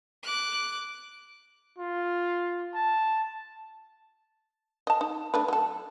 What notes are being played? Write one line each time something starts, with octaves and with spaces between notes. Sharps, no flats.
D6 F#6
F4
A5
D#5 A5
D#4
A3 D4 B4
F#3 A4